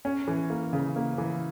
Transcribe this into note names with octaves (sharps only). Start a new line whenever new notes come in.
C#4
E3
A#3
C#3
A#3
E3